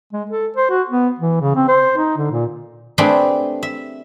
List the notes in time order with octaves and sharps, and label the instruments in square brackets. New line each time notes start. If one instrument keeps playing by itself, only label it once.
[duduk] G#3
A4
C5
F#4
B3
E3
C#3
C4
C5
D#4
D3
A#2
[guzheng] A3 C4 D4 G4 G#4 B4
E5